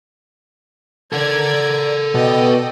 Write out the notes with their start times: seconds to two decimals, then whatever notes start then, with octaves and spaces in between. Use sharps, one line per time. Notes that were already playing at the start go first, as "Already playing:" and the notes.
1.13 A4 A#4 D5 F#5 G#6
2.14 B2 D5 D#5 G5